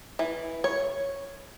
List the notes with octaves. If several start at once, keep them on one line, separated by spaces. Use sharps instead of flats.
E3
C#5